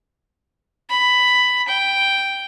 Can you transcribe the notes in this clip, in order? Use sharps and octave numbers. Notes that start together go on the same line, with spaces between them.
B5
G5